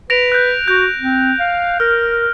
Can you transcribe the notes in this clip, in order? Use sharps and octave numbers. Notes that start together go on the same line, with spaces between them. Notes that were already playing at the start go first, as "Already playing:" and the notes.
B4 A#6 D7 F7
F#6 G6
F#4 G6
C4
F5
A#4 F6